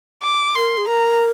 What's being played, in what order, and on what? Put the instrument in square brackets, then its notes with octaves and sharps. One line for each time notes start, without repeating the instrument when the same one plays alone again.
[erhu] D6
[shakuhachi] A#4 [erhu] C6
[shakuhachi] G#4
[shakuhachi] A#4 [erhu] A#5